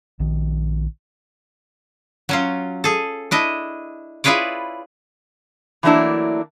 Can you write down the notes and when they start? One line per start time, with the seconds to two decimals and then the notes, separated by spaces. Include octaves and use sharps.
0.19 A#1 D#3
2.29 F#3 C#4 F4
2.84 G#4 A4
3.31 D4 E4 D#5
4.24 E4 F4 G#4 B4 C#5 D5
5.83 E3 F#3 A3 A#3 D4 E4